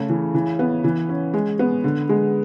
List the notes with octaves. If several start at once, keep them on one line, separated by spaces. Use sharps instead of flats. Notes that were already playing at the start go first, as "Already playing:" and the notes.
Already playing: C#3 A3
E3
E3
B3
E3
C#4
G#3
B3
D3
G#3